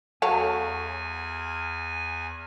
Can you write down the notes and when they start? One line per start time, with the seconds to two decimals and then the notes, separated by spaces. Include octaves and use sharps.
0.22 E2 F#3 A4 F5 G#5